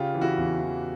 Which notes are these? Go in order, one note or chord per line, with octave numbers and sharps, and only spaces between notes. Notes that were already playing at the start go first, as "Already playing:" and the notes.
Already playing: C#3 F4 G4
E3
E4 F#4
E2
E3